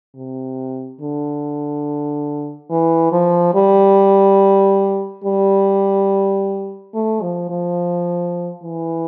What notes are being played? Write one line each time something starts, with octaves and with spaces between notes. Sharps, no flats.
C3
D3
E3
F3
G3
G3
A3
F3
F3
E3